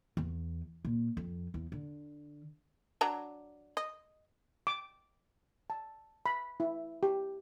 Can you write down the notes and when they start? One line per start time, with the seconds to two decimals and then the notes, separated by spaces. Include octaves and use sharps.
0.17 E2
0.85 A#2
1.17 F2
1.54 E2
1.72 D3
3.01 F#3 D4 A#5
3.77 D#5
4.67 D6
5.70 A5
6.26 B5
6.60 E4
7.03 G4